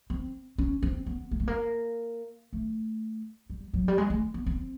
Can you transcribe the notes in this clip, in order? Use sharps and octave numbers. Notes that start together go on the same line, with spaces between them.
C4
C#4
C4
B3
A#3
A3
A#3
A3
G3
F#3
G3
G#3
A3
B3
C4